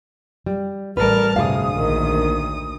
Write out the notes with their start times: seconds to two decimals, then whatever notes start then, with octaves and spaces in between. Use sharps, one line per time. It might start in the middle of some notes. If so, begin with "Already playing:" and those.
0.46 G3
0.97 A1 G3 A#4 B4 A5 F6
1.36 D2 G2 C3 G#4 F5 D#6
1.74 A#1 D#3